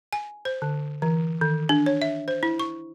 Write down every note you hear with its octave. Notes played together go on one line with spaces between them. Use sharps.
G#5
C5
D3
E3
D#3
D4
C#5
E5
C5
E4
C#6